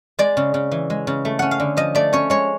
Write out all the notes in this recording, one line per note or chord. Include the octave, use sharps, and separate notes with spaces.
G#3 D5
C#3
C#3
E3
G#3
C#3
A3
C#4 F#5
F5
D3
F3 D#5
A3 D5
C#4 C#5
G#3 C#5